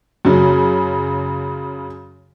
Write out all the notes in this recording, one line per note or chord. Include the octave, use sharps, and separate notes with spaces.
F#2 C#3